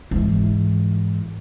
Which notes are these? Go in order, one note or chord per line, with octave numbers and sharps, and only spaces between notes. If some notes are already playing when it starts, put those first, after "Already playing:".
G#2 E3